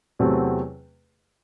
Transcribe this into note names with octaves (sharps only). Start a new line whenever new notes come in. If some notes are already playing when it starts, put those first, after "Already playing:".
E2 C3 F#3 A3 C4